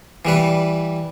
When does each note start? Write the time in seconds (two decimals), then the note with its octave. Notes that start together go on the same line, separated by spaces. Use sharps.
0.25 E3 G3 B4